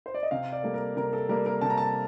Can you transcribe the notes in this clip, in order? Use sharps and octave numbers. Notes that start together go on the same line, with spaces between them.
C5
D5
D#5
C3 F5
D5
G3 A#3 A4
A#4
C3 A#4
A4
G3 A#3 A#4
A#4
C3 A5
A#5
A5